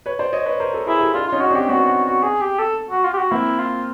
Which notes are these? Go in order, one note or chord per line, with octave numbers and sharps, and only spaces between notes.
B4 C#5
C5 D5
C#5 D#5
B4 C#5
A#4 C5
A4 B4
E4 G#4 A#4
G4 A4
D4 E4 F4
C#4 D#4 F4
F#4
C4 D4
G4
B3 C#4 F#4
F#4
F#4
G#4
G4
A4
F#4
F4
G4
F#4
A#3 C4 E4
F4